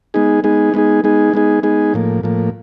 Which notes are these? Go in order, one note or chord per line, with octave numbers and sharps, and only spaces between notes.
G#3 B3 D#4 G#4
G#3 B3 D#4 G#4
G#3 B3 D#4 G#4
G#3 B3 D#4 G#4
G#3 B3 D#4 G#4
G#3 B3 D#4 G#4
A2 F3 A#3
A2 F3 A#3